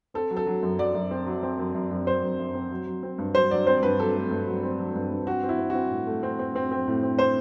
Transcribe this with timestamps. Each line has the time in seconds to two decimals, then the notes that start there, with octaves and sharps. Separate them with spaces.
0.14 C4 A4
0.31 F#3
0.37 A4
0.47 F#3
0.63 F#2
0.79 F#3 D5
0.95 F#2
1.11 C4
1.26 F#3
1.43 C4
1.59 F#2
1.75 F#2
1.91 F#2
2.06 F#2 C5
2.23 F#2
2.39 F#2
2.55 C4
2.71 F#3
2.87 F#3
3.03 C4
3.18 G2
3.35 F#3 C5
3.51 F#3 D5
3.67 C4 C5
3.83 G2 B4
3.98 F#3 A4
4.15 A3
4.31 G2
4.47 F#3
4.63 C4
4.79 F#3
4.95 G2
5.11 G2
5.27 C4 F#4
5.43 C4
5.49 E4
5.59 C4
5.70 F#4
5.75 C4
5.91 A2
6.07 A3
6.23 C4
6.39 C4
6.55 C4
6.71 C4
6.87 A2
7.03 C4
7.18 C4 C5